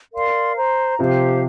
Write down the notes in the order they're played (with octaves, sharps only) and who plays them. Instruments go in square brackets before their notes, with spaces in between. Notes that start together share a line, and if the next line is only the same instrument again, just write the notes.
[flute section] A#4 D5 F5 C6
C5 A#5
[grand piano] C3 F3 [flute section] G4 C5 F5